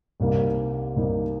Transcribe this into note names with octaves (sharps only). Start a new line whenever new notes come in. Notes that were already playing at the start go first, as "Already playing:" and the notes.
C2 C3 G3 A#3 D#4
C2 C3 G3 A#3 D#4